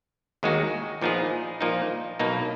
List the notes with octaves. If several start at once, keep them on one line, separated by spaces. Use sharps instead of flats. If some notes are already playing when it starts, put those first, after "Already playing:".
D#2 D#3 G#3 D#4 F#4
A#2 F3 B3 D#4 G#4
A#2 F3 A#3 D#4
B1 B2 A#3 D#4